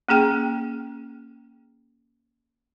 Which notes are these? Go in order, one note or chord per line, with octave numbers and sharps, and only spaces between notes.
A#3 C#4 G#4 G5